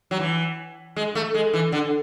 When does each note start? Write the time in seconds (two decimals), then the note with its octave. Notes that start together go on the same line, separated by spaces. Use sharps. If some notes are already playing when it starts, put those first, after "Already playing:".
0.11 F#3
0.20 E3
0.96 G#3
1.15 A3
1.34 G#3
1.54 E3
1.72 D3